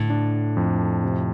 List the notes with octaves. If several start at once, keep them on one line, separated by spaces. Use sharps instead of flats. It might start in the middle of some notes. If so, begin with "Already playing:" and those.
Already playing: A2 D3
D4
F2
C3